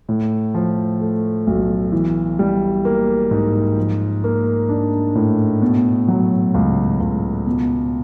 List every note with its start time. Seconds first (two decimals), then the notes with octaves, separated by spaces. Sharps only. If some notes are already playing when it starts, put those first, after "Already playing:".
0.09 A2
0.54 F3
1.00 A3
1.47 B1
1.92 E3
2.39 G3
2.85 A#3
3.31 G#2
3.77 F3
4.24 A#3
4.69 D4
5.15 A2
5.62 B2
6.08 F#3
6.54 C#2
7.00 C#2
7.46 B2